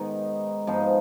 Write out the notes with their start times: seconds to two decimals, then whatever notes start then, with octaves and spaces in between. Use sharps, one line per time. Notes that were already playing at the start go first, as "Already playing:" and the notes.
Already playing: G#2 D#3 B3 D#4
0.67 G#2 F3 B3 D#4